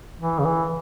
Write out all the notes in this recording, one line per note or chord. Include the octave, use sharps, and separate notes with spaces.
E3
C#3
E3